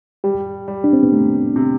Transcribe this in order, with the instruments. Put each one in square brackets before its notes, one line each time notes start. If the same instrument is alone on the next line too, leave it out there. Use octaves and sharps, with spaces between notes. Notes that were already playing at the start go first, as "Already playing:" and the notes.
[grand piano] G3 [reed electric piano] G4
[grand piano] G3
[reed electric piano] D4
C4
B3
[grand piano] C3 [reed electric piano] A3
[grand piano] C3